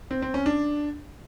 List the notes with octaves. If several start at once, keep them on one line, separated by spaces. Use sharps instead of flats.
C4
C4
C#4
D4